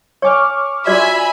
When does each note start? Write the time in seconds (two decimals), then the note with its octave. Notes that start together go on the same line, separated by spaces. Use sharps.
0.22 C#5 G#5 C#6 D6 F6
0.87 F4 F#4 D5 E5 G#5 B5